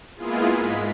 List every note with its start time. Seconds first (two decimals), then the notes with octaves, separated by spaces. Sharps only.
0.16 G#3 A#3 B3 E4 F4 G#4
0.54 G#2 G#3 B6